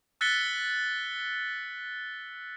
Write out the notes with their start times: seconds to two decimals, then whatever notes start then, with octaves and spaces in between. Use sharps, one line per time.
0.21 E6 F#6 A6 B6 C#7 G7